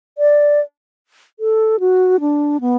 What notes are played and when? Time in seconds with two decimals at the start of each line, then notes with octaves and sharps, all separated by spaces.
0.18 D5
1.39 A4
1.80 F#4
2.20 D4
2.61 B3